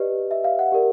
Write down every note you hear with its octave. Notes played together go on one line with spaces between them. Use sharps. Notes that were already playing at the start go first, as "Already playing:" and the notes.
Already playing: G4 B4 D5 D#5
E5
F5
F#5
G4 A#4 D5